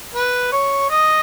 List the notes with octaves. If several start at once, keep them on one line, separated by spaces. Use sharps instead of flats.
B4
C#5
D#5